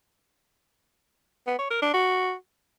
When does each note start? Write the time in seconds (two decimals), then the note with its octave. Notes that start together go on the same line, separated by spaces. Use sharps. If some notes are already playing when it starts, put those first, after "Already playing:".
1.47 B3
1.59 C#5
1.70 A#4
1.82 D4
1.94 F#4